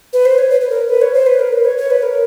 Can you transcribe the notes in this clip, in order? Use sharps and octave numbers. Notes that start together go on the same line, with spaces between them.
B4
C5
C#5
B4
B4
A#4
B4
C#5
C5
B4
A#4
B4
C#5
C#5
B4
A#4